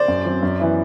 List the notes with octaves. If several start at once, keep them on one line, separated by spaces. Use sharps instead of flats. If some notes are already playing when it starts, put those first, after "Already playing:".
Already playing: C5 D5
F#2
F#3 C4
F#2
E3 B3 E4